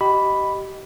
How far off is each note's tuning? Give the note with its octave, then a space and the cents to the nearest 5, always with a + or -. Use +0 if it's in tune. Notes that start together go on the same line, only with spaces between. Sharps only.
G4 -25 D#5 +0 B5 +0